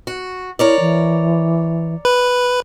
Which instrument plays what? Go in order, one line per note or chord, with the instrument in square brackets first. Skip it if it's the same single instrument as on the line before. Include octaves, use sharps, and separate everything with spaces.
[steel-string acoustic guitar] F#4
[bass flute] E4 [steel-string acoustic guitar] A#4 C#5 D5
[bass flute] E3
[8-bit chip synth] B4